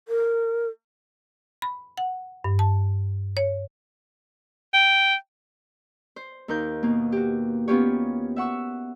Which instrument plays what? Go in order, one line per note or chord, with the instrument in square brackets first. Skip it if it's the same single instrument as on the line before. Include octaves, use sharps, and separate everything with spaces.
[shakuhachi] A#4
[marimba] B5
F#5
G2
A5
C#5
[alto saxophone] G5
[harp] C5
D#2 D#4 A#4 G6
B2 A#3
F#4 G4
B3 C#4 F4 G4 C#5
E5 F#5 C#6 E6